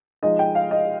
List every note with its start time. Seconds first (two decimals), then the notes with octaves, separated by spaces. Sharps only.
0.22 F3 G#3 D#4 D#5
0.39 G5
0.55 F5
0.71 D#5